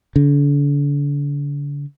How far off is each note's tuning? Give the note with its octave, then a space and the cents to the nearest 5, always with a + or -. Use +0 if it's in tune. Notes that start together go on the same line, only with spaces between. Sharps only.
D3 -40